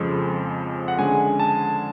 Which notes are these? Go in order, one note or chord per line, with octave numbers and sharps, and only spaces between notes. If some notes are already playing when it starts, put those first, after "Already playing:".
Already playing: F2 C#3 F3 G#3
F#5
D3 G#3 C#4 G#5
A5